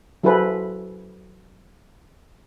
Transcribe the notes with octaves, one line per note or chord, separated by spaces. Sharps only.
F#3 E4 G#4 A4 B4 C5